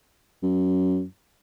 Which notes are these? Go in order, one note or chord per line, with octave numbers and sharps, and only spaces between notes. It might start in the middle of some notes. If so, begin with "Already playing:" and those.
F#2